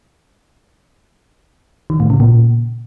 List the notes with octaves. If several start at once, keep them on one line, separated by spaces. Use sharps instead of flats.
D#3
A2
C#3
A#2